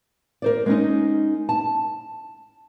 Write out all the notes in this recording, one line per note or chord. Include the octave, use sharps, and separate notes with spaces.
A#4 C5 D5
G#3 C#4 D#4
A5